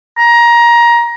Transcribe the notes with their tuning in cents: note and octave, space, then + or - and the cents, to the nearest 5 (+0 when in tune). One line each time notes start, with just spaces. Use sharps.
A#5 +20